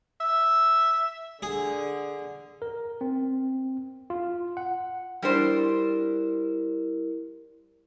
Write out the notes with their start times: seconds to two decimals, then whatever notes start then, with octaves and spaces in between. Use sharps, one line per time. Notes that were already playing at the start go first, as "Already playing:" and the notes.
0.20 E5
1.43 D3 G#4
2.62 A#4
3.01 C4
4.10 F4
4.57 F#5
5.22 G3 D4 E4 A#4 C5